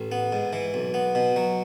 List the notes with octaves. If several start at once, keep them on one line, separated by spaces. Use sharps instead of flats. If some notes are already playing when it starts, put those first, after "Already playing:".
Already playing: A1
B3
G#2
E3
B1
B3
B2
F#3